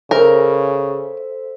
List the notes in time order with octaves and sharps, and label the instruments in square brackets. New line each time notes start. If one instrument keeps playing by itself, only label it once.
[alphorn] C#3 [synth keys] A4 C5 E5 [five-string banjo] A#4